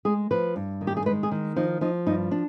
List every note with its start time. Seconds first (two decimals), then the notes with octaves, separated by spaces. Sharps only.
0.05 G#3 G#4
0.31 F3 B4
0.56 G2
0.81 D#3
0.87 G4
0.97 G#4
1.06 G#3 B4
1.23 G#4
1.31 D#3
1.56 F3 D#4
1.81 F3 D#4
2.06 G2 D#4
2.31 D4